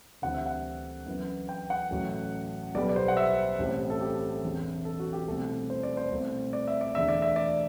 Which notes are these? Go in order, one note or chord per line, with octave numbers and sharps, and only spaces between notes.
D2 C3 E3 G3 C4 F#5
E5
F#5
F#2 E3 B3
G5
F#5
A1 A2 F#3
B1 B2 G3 B3 D5
D5
C5
F#5
E5
A1 A2 G3 C4
A4
G4
E1 E2 C3 E3
A4
F#4
G4
C2 B2 A3 C4 A4
C5
D5
C5
C2 B2 A3 C4
D5
E5
D5
E2 D3 A3 E5
D5
E5
D5